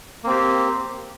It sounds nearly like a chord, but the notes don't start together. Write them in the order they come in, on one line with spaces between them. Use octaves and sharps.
A#3 C4 G4